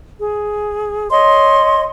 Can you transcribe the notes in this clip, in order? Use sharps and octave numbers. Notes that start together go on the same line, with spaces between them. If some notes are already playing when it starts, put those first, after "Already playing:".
G#4
C#5 D#5 C6